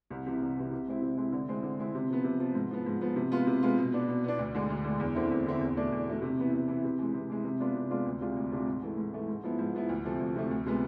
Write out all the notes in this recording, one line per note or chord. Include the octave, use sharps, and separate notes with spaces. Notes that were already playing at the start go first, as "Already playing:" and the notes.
C2
C3 E3
C2
C3 E3
C3
G#3 C4 E4
C3
G#3 C4 E4
D3
G#3 C4 E4
D3
G#3 C4 E4
C3
F3 B3
C3
F3 B3
G#2
F3 B3
G#2
F3 B3
C3
G#3 B3 F4
C3
G#3 B3 F4
B2
B3 D4
B2
B3 D4
D2
D3 G#3
D2
D3 G#3
E2
D3 A3 C4 E4
E2
D3 A3 C4 E4
E2
B2 A3 D4
E2
B2 A3 D4
C3
E3 B3 E4
C3
E3 B3 E4
C3
E3 G#3
C3
E3 G#3
C3
G#3 B3 D4 F4
C3
G#3 B3 D4 F4
D2
C3 G#3 D4 F4
D2
C3 G#3 D4 F4
G#2
E3 A3
G#2
E3 A3
G#2
F3 B3 E4
G#2
F3 B3 E4
D2
C3 F3 A3
D2
C3 F3 A3
D2
C3 F3 G#3 B3